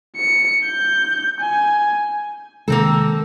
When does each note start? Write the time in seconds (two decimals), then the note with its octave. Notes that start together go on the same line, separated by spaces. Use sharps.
0.17 C#7
0.66 G6
1.41 G#5
2.68 C3 D#3 G#3 A#3 C4 A4